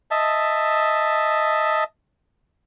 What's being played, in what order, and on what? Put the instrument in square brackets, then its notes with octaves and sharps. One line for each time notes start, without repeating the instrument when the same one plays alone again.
[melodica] D#5 E5 A5